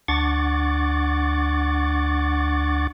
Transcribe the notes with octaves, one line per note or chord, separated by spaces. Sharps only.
D2 D4 F#5 C#6 D6 A6